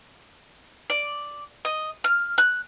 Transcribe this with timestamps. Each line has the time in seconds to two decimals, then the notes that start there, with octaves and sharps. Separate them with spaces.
0.90 D5
1.65 D#5
2.04 F6
2.38 F#6